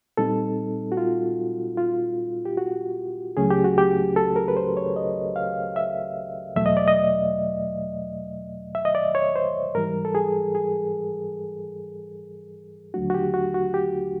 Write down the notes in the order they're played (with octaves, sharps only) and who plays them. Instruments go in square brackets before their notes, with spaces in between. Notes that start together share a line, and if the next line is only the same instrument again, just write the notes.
[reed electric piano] A#2 G3 C4 D#4 A4
F#4
F4
F4
G4
F#4
C#2 C#3 F#3 A3 C#4 G#4
G4
F#4
G4
A4
A#4
B4
C5
C#5
D#5
F5
E5
E2 B2 F#3 A3 E5
D#5
D5
D#5
E5
D#5
D5
C#5
C5
G#2 E3 G3 A#4
A4
G#4
G#4
D#2 D3 F#3 A3 D4 F#4
F#4
G4
F#4
F#4
G4